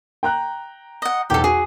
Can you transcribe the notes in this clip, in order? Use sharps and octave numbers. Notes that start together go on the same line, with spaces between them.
G5 A#5 F#6
D#5 F#5
B1 E2 G4 A4
F#4 G#4